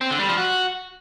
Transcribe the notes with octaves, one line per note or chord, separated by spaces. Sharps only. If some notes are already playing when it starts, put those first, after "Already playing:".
C4
D3
G3
F3
F#4